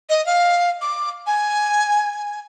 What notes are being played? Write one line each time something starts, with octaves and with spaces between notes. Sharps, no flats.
D#5
F5
D6
G#5